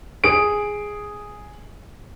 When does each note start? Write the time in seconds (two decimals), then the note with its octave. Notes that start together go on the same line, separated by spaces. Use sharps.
0.24 G#4 D7